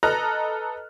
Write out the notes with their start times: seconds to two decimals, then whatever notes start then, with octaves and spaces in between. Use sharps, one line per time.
0.03 A4 B4 D#5 A#5 F6 F#6